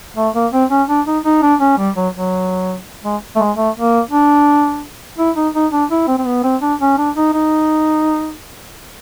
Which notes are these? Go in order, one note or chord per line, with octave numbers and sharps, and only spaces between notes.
A3
A#3
C4
C#4
D4
D#4
D#4
D4
C#4
G3
F#3
F#3
G#3
A3
G#3
A3
A#3
D4
E4
D#4
D#4
D4
E4
C4
C4
B3
C4
D4
C#4
D4
D#4
D#4